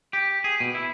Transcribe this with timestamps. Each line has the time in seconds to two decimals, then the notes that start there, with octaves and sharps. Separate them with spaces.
0.13 G4
0.44 G#4
0.60 B2
0.75 E4